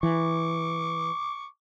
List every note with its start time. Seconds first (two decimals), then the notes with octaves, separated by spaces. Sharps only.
0.03 E3 C#6 D6